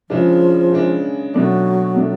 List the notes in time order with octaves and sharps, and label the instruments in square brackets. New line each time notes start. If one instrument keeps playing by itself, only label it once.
[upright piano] C#3 G#3 D4 [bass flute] F3
[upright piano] C#3 G#3 D4
[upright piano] B2 A3 D4 [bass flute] F#3
[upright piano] B2 A3 D4